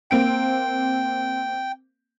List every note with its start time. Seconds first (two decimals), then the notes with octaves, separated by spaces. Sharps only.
0.11 A#3 C4 G5 D7